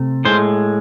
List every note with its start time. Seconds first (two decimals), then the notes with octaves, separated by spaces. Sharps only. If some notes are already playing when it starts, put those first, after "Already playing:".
Already playing: C3 A3
0.25 A2 G#3 C5